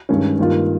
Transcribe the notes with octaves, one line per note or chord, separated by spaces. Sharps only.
G2 D#3 G#3 C#4
G2 D#3 A#3 F4